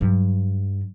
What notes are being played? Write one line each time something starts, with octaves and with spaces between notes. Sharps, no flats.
G2 F#3